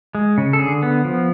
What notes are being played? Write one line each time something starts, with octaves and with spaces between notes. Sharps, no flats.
G#3
C#3
A4
D3 G#4
B3
F3